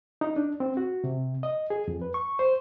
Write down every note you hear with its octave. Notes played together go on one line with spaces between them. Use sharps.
D#4
D4
C4
F#4
C3
D#5
G#4
F2
B4
C#6
C5